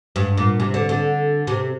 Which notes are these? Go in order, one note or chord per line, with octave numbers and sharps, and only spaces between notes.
G2
A#2
C3
D3
D3
C3